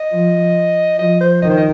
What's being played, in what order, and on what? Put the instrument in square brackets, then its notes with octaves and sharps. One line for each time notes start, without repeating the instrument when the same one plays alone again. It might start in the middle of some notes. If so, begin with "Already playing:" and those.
Already playing: [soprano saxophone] D#5
[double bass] F3
[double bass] F3 [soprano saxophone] D#5
[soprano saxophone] C5
[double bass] D#3 [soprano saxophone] D#5
[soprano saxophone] C5
D#5